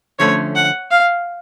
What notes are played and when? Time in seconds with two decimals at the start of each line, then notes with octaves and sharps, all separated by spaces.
0.19 D3 F3 A3 C#4 C#5
0.56 F#5
0.91 F5